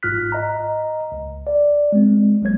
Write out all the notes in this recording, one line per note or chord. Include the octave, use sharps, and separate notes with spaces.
G#1 G#2 F4 F6 F#6 B6
D#5 A#5
C#2
D5
G#3 C4
A#1 F#3 G#3 A#3 C#5 G#6